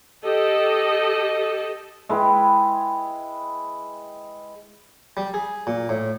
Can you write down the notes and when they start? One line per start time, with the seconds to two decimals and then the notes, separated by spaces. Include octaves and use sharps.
0.23 G4 A4 D#5
2.09 G#3 E4 B4 G5
5.17 G3
5.34 G#4
5.67 A#2
5.89 A2